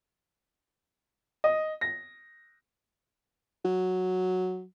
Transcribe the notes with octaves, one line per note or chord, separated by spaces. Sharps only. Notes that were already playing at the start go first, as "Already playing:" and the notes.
D#5
A#6
F#3